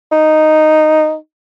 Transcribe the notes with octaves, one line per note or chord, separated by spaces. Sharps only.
D#4